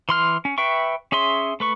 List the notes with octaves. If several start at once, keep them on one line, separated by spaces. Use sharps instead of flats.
E3 C6 F6
C#4
B4 E5 G5 C#6
C#4 G#4 E5 C6
A3 B4 C#6